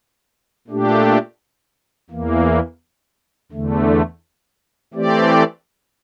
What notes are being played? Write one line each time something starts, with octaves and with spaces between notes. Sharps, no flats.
A#2 A3 D4 G4
E2 E3 A#3
E2 D3 A3
E3 A3 C4 G4 D5